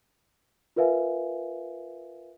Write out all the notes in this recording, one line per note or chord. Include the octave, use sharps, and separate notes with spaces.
F4 A#4 B4 E5 F5 G#5